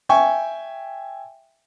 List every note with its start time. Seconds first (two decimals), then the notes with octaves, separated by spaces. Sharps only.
0.09 E5 G5 G#5 C#6